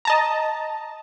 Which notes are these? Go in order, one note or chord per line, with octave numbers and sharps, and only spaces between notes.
D#5 A5 A#5